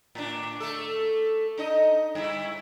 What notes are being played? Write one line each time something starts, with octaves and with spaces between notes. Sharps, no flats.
A2 D4
A3 A4
D4 D#4 D#5
G2 E4